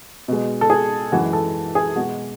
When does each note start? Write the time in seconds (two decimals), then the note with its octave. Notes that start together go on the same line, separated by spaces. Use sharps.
0.28 B2 G#3
0.61 A4
0.70 G#4
1.12 F#2 E3 G#3 F#4
1.33 A4
1.75 G#4
1.96 B2 G#3 F#4